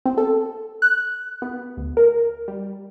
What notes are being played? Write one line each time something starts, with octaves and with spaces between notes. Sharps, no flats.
C4
A4
F#6
B3
D2
A#4
G3